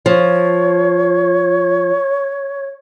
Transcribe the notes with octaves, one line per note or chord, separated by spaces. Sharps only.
F3 C#5